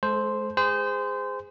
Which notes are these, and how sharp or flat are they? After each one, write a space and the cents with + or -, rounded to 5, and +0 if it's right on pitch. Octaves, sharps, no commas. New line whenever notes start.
G#3 +30 A4 -25 C5 +0
G#4 -20 C5 -25